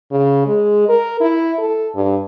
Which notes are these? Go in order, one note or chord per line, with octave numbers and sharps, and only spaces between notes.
C#3
G#3
A#4
E4
A4
G2